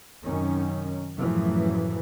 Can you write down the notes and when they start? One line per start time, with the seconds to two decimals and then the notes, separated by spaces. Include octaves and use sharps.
0.22 F#2 C3 D#3 C#4
1.17 F#2 A2 C#3 E3 F3 A3